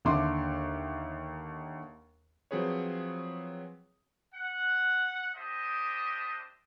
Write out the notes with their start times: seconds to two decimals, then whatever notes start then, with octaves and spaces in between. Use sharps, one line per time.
0.05 D#2 D3 E5 C6 D6
2.51 F3 F#3 C4 G#4 B4 C#5
4.34 F#5
5.36 D4 G4 C5 D#5 E5